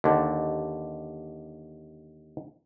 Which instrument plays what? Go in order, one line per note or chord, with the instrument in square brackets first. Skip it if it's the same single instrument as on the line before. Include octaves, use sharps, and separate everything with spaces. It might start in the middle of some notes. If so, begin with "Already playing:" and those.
[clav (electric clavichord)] D#2 D3